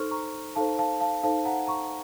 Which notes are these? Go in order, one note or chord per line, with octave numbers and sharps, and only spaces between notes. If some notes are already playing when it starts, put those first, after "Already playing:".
Already playing: D#4 A4 C5 C6 C#6 F6
A#5 C#6
D#4 A4 C5 F5 A5
F5 A5
F5 A5
D#4 A4 C5 F5 A5
F#5 A#5
A#5 C#6